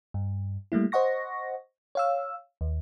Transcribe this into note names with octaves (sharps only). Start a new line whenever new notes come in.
G2
G3 A3 A#3 E4
C5 D#5 F#5 C#6 A#6
C#5 F5 E6
D#2